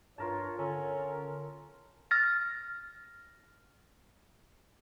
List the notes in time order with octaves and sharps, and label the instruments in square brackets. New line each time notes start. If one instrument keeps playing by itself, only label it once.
[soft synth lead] G2 [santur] F4 A#4 A5 [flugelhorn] C#5
[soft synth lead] D3 [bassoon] C#4 [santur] A4 [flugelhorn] A#4
[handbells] F6 A6 A#6